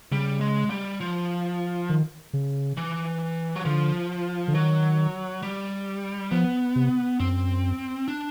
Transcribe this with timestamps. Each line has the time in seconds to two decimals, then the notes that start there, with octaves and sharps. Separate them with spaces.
0.11 C#3 G3
0.41 G#3
0.70 G3
1.01 F3
1.89 D#3
2.33 C#3
2.77 E3
3.55 F#3
3.65 D3 F3
4.48 D3
4.54 D#3 F#3
5.43 G3
6.31 F3 B3
6.76 C3
7.20 F#2 C4
8.08 D4